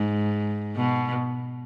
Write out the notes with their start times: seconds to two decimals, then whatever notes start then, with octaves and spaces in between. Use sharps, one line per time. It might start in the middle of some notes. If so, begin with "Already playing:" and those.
Already playing: G#2
0.76 B2